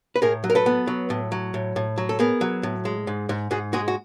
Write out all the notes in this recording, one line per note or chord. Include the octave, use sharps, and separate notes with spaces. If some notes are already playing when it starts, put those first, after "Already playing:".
B4
A2 G#4 A#4
F#3
A#4
A4 B4
B3
F#3
A2
F#3
A2
A2
F#3
A4
B3 G#4 A#4
F#3
A2
G#3
G#2
G#2
G#2 F#4 G#4
G#3 F#4 G#4
F#4